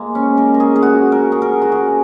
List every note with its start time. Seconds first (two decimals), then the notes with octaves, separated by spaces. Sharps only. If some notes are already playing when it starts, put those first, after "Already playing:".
Already playing: G#3 A#3
0.15 C#4
0.37 A#4
0.54 A#4
0.60 G#4
0.76 G#4
0.83 F#4
1.12 A#4
1.32 G#4
1.42 A#4
1.62 F#4
1.72 G#4